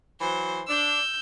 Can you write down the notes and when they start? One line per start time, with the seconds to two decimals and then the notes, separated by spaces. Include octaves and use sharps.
0.20 E3 F#3 C5
0.68 D4 E6 G6